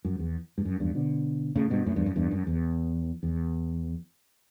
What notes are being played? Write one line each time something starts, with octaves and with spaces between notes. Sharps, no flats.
F#2
E2
G2
F#2
E2 G2
B2 D3
A2 C#3
G2 B2
F#2 A2
E2 G2
F#2
E2 G2
F#2
E2
E2